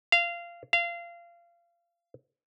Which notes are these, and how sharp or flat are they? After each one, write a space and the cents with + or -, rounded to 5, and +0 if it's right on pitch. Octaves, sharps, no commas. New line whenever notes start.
F5 -20
F5 -25